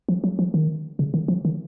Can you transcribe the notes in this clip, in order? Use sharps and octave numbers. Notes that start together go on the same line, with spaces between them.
F3
F#3
F3
D#3
C#3
D#3
F3
D#3